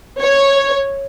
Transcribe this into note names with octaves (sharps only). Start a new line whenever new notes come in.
C#5